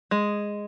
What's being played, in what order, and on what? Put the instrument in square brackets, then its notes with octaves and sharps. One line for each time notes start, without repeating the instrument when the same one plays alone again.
[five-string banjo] G#3